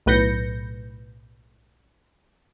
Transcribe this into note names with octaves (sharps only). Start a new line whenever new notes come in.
B1 A2 B4 G6 A#6 C#7